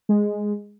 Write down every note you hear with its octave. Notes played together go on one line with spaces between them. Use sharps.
G#3